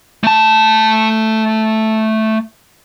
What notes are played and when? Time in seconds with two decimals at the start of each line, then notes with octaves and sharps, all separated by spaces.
0.24 A3 A5